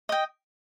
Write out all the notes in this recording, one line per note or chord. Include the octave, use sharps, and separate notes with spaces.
D#5 G5